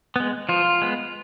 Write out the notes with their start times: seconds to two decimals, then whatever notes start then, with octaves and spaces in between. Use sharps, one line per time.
0.16 G#3 B3
0.49 F3 F4
0.82 G#3 B3